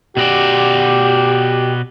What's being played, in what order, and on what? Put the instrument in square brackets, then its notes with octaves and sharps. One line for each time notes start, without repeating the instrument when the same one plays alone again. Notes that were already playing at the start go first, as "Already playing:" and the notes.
[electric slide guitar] B2 F#4 D5 [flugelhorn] G4